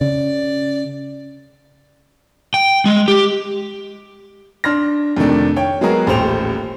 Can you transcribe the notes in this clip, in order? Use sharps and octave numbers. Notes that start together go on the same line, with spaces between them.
C#3 D5
G5
G#3
G4
D4 C6 F6 A#6
F2 C3 D#3 A3 D4
C#5 G5
F#3 G#3 B3 F#4 G#4 A#4
D#1 A1 A3 C5 G5 F7